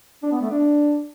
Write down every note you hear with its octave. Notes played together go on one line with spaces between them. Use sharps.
D4
B3
A3
D4